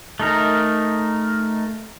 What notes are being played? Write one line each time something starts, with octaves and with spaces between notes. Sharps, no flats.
A3 D#4 A#4